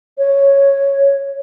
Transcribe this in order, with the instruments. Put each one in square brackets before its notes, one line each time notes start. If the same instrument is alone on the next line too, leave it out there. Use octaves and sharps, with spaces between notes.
[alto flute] C#5